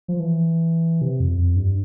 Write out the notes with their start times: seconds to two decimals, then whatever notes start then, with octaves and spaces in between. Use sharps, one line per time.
0.08 F3
0.20 E3
1.01 C3
1.20 F2
1.38 F2
1.56 G2